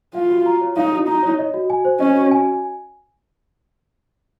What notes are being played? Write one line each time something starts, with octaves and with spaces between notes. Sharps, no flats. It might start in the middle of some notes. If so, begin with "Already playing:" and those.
F4 F5
F#4
A#5
C#5
D#4 F5
F#4
D#4 A#5
C#5
D#5
F#4
G#5
C5
C#4 D#5
F#4
G#5